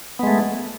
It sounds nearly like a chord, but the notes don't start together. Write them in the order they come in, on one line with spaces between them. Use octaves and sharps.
B3 G#3 A3